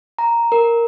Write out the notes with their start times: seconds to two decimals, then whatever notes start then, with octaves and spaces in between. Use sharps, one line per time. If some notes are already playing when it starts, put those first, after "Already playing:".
0.19 A#5
0.52 A#4